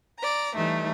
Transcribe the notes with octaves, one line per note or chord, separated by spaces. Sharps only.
D5 A#5
E3 G3 A3 D#4